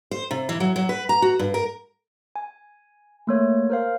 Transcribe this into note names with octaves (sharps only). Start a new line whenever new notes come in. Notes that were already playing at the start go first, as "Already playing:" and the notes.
C5
C3
E3
F#3
F#3
B4
A#5
F#4
G2
A#4
G#5
A3 A#3 C#5
A#4 C5 F5